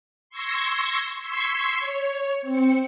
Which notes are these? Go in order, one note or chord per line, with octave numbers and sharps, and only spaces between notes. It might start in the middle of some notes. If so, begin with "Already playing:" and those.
C6 C#6 E6 G#6 A#6
C6 C#6 E6 G#6 B6 C7
C#5
C4 C#7